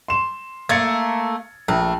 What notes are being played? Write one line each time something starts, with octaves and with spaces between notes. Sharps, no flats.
C6 E7
A3 A#3 G#6 A6 C#7
A#1 A3